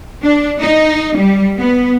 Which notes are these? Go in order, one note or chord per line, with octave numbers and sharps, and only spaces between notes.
D4
D#4
G3
B3